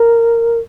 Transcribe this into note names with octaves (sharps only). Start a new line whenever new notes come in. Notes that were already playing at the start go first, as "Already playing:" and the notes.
Already playing: A#4